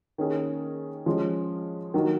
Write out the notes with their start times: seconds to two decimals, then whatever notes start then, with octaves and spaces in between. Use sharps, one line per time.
0.18 D#3 A#3 C#4 G#4
1.06 F3 G#3 C#4 G#4
1.94 D#3 F#3 A#3 D#4 F#4